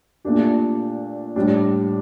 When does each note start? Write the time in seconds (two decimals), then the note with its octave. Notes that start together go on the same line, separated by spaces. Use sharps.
0.25 A#2 A3 D4 G4
1.36 A2 G3 D4